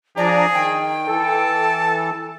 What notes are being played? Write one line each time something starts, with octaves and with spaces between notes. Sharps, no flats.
F3 D4 G#4 D5 A#5
D#3 G5
E3 A4 A5